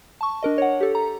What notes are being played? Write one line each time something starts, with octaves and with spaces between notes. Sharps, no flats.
A5 C#6
D4 A#4 D#5
C#5 F#5
G4 A4
A#5